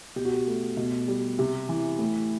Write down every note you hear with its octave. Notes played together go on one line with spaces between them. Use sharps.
B2 G4
F#4
G4
A3
B2
G3
C3
E3
A2